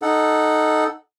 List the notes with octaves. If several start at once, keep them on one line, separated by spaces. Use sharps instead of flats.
D#4 A4 F#5